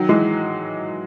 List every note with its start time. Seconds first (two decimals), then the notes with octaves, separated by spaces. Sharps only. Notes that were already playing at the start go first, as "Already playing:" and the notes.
Already playing: D#3 F#3
0.09 E3 G#3